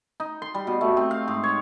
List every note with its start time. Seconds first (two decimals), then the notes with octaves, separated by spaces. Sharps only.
0.20 D#4
0.42 C6
0.54 G3
0.67 B2
0.81 A3
0.97 C4
1.11 F5
1.28 G#2
1.43 C#5